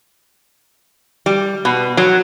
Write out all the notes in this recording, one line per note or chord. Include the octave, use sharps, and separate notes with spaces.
G3
B2
F#3